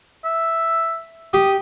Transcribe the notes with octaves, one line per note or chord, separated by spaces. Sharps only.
E5
G4 D#6